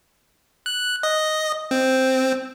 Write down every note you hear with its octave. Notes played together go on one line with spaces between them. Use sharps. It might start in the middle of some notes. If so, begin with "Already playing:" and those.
F#6
D#5
C4